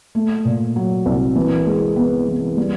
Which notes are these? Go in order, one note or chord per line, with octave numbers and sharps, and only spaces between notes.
A3
A#2
F#3
C2
E3
G#3
B3
E3
G3